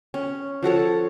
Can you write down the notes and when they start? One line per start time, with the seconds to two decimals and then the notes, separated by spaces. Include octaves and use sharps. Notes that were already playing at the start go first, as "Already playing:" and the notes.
0.14 C#4
0.63 F3 F#4 A4 C#5